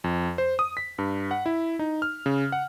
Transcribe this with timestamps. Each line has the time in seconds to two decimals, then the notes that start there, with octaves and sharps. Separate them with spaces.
0.04 F2
0.38 C5
0.59 D#6
0.77 B6
0.98 G2
1.31 F#5
1.46 E4
1.79 D#4
2.02 F6
2.26 C#3
2.52 F#5